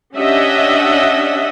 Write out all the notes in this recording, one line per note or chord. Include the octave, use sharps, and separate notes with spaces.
C#4 D4 G4 D#5 E5 F#5